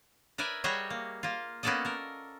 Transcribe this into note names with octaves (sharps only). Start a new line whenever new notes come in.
A#4 B4 D5 E5 G#5
G3 F#4 G#4 C#5 D#5 E5
A#3
A#3 F4
A#3 B3 C#4 A4 D5 D#5
A4 A#4